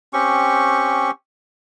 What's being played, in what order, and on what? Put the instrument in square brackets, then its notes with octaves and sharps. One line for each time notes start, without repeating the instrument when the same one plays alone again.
[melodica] C4 C#4 G4 C#6